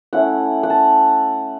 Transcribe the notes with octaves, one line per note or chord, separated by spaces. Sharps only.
A3 C#4 E4 F#5
F#5
A5